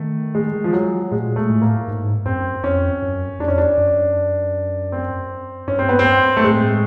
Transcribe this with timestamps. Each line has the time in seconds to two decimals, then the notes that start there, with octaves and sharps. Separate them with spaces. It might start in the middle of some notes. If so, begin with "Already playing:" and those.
Already playing: D#3 A3
0.35 G#3
0.64 F3
0.73 F#3
1.11 A#2 G#3
1.36 A3
1.49 A2
1.62 A#3
1.88 G#2
2.25 F#2 C4
2.63 F2 C#4
3.02 F#2
3.39 F2 D4
3.48 C#4
3.58 D4
3.77 F#2
4.92 C4
5.67 G2 C#4
5.79 C4
5.89 B3
5.99 C4
6.37 A3
6.44 A2 G#3